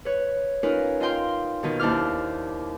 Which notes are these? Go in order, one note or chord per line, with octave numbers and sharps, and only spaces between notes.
B4 C#5
C#4 D#4 F4 A#4 B4
F4 D#5 F5 G5 C6
B2 D#3 D#4
D#2 D4 E4 C5 D6 F6